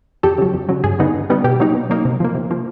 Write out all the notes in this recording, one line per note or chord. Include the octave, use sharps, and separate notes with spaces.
F2 G4 A4
C#3 F#3
F2
C#3 F#3
G2 G#4
D3 G3 B3 D#4
G2
D3 G3 B3 D#4
B2 G4
F#3 A#3 D#4
B2
F#3 A#3 D#4
C3
F3 A#3
C3
F3 A#3